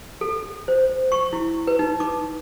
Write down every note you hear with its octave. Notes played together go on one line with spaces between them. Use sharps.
A4
C5
C#6
E4
B4
D#4
D6